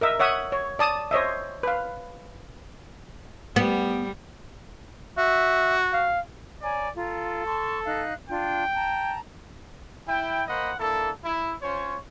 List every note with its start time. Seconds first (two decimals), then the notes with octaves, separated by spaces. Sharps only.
0.01 A#4 D#5 E5
0.19 C#5 E5 F#5 D#6
0.52 C#5
0.79 D5 A5 D#6
1.11 C5 C#5 D#5 E5
1.63 B4 F5
3.56 G3 B3
5.18 F#4 E5
5.93 F5
6.63 C#5 D5 G#5 A#5
6.97 F4 A4 A#5
7.46 A5 C6 C#6
7.85 D#4 F5 F#6
8.29 D4 F4 G5
8.75 A5 A#5
10.08 E4 G5
10.48 A#3 C5 D#5 F#5 B5
10.79 A#3 D4 E4 A4
11.25 E4
11.63 C#4 F4 C5 C#5